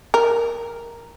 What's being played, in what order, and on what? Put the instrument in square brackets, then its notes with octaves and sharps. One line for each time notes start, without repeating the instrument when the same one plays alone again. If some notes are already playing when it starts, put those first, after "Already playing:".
[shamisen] A#4